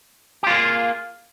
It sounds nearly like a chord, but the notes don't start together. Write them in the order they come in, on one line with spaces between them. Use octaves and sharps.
G4 F4 A#3 G#4